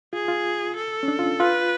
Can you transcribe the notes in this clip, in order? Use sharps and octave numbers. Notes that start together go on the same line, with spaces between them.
F4 G#4
F4
A4
C#4
D4
F4
F4 B4